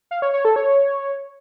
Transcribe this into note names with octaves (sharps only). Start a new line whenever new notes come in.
F5
C#5
C#5
A4
C#5